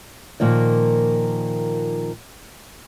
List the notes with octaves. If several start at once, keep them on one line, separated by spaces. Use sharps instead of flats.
A#2 D#3 F3 A#3 D5